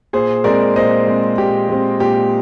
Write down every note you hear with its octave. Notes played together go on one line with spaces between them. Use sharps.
A#2 G#4 C5
G#3 C4 A#4 D5
A#2 C5 D#5
G#3 C4
A#2 G4
G#3 C4
A#2 G4